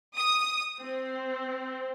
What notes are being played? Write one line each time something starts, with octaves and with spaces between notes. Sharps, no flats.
D#6
C4